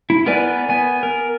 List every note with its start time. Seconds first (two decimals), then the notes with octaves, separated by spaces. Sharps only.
0.10 E4
0.26 B3 A#4 B4 D5 G#5
0.69 B3 G#5
1.03 A#4